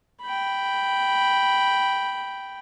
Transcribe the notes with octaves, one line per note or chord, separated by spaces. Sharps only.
G5 B5